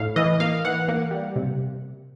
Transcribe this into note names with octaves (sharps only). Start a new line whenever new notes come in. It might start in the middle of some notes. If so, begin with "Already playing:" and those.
Already playing: A2 F5
E3 D#5
A#3 F5
E3 F#5
A#3
G3
C3